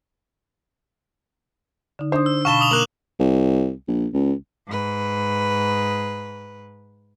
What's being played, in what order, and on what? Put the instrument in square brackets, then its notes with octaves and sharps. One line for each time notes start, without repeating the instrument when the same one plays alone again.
[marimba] D3 D#4
[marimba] D4 D#6 [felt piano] C5
[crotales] E6
[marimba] B2 [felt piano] F5 A5 B5 [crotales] C#6 E7 G7
[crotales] D6 D#6 F7
[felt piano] A#3 [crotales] F#6 F#7
[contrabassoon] C2
A#1
C#2
[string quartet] G#2 B4